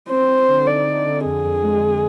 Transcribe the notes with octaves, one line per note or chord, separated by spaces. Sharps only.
C4 C5
C4
D3
D#4 D5
D3
D3
F2 G#4
F2
G#3
G#3